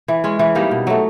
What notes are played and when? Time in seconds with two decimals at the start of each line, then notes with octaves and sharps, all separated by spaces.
0.08 E3
0.24 G#3 C#4
0.39 E3
0.55 G3 A#3 D#4
0.71 B2
0.87 F#3 A3